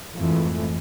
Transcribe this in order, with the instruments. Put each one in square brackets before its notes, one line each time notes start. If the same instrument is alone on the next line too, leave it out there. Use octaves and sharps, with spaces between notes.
[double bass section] F2 G#2 E3 A3